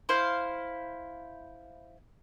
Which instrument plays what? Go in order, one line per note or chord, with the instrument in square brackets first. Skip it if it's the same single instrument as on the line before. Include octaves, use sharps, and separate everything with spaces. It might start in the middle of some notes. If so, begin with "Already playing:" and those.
[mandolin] E4 C5 F5